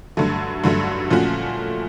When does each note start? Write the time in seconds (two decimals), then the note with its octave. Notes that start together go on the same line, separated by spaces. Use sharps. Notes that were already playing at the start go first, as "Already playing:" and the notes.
0.17 G2 D3 F#3 A3
0.64 G2 D3 F#3 A3
1.10 A#2 F3 A3 C#4 F#4